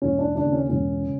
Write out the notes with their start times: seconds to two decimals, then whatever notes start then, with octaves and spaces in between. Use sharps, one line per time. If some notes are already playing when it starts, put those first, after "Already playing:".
0.02 E1 C#4
0.18 D4
0.35 D#2 C#3 D4
0.52 C#4
0.69 E1 C#4
1.03 C#3